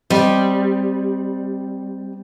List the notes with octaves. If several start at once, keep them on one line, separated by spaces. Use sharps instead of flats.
G3 C4 D#5